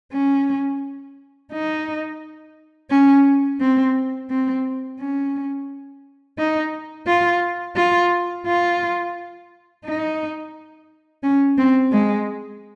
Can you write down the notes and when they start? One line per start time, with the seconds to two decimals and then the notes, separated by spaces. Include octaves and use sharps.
0.13 C#4
1.53 D#4
2.91 C#4
3.61 C4
4.30 C4
5.00 C#4
6.38 D#4
7.07 F4
7.76 F4
8.46 F4
9.85 D#4
11.23 C#4
11.58 C4
11.92 G#3